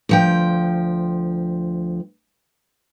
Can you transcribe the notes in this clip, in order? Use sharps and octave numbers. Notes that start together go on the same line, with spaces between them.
D2 F3 G5